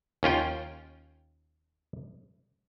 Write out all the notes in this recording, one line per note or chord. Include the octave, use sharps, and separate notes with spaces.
D#2 C#4 F4 G5